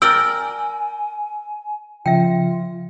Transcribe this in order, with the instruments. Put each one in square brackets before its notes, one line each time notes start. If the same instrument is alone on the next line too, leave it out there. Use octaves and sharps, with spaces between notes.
[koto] A#4 D5 G5 [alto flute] G#5 [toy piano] E6
[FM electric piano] C#3 F3 [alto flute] F4 [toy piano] E5 G5